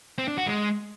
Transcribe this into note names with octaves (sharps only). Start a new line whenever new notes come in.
C4
D4
F#4
G#3